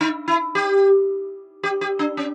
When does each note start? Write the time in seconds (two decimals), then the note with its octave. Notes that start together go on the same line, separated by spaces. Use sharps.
0.01 D#4
0.28 E4
0.55 G4
1.63 G4
1.81 G4
1.99 D4
2.17 C#4